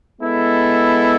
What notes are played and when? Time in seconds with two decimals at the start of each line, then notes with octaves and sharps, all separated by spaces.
0.21 G#3 B3 E4 A4